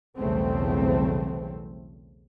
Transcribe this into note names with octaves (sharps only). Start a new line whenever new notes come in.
B1 E2 C#3 G3 A3 C4